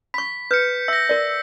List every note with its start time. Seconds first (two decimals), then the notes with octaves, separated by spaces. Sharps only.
0.14 B5 C#6 B6
0.51 B4 G6 C#7
0.88 E5 E6 A#6
1.09 A#4 D5